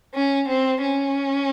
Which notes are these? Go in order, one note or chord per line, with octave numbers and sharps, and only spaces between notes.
C#4
C4
C#4